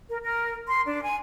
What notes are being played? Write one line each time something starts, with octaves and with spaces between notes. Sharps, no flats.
A#4
A#4
C6
D4
G#5